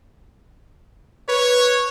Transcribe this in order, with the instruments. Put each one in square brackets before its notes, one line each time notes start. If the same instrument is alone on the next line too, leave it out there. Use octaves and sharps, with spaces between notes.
[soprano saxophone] B4 [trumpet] C#5